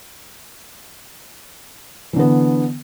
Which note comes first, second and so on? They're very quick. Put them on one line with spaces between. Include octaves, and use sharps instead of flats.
E3 D3 B3